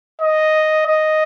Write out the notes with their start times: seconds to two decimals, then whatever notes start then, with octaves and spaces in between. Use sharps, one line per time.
0.22 D#5
0.87 D#5